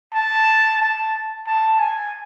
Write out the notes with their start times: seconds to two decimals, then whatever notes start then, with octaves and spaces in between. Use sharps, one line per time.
0.14 A5
0.80 A5
1.47 A5
1.80 G#5